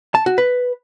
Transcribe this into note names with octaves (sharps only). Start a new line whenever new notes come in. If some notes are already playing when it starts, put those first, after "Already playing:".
A5
F#4
B4